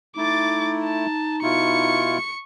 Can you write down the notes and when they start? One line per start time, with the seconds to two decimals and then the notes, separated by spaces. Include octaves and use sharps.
0.17 A3 D#4 E4 D6 A6
0.85 A5
1.43 B2 E4 F4 C#6 C#7